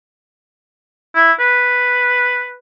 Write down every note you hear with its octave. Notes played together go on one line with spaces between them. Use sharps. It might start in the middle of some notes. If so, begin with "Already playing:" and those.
E4
B4